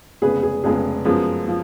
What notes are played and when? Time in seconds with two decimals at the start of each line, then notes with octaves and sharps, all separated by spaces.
0.22 F1 F2 C#3 G#3 B3 G#4 B4
0.43 G#4
0.64 F1 F2 C#3 G#3 B3 G#4
1.05 F#2 F3 G#3 B3
1.48 F3